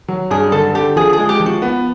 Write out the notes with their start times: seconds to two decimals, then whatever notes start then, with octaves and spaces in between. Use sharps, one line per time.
0.08 F#3
0.31 G2 G#4
0.52 D3 A4
0.74 D3 G4
0.96 F3 G#4
1.13 G#4
1.18 G#3
1.29 G4
1.40 F3
1.46 F#4
1.62 B3